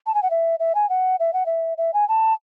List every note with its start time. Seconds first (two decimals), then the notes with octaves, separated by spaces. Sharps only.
0.06 A5
0.14 G#5
0.23 F#5
0.31 E5
0.60 E5
0.75 G#5
0.89 F#5
1.20 E5
1.33 F#5
1.46 E5
1.78 E5
1.94 G#5
2.09 A5